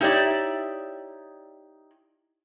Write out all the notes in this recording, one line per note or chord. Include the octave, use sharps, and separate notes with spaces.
D#4 E4 G4 C#5 D5 E5